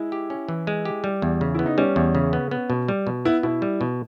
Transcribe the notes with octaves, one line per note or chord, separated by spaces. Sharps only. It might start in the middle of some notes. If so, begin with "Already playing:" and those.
Already playing: G#3 E4
G4
C#4
E3
G#3
G4
G3
E2
C#3
B3 E4
D#4
G3 C#4
E2
C#3
B3
B3
B2
G3
B2
B3 E4
B2 E4
G3
B2